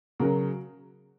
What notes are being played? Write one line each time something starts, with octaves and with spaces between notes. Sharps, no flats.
C#3 F#3 F#4 A#4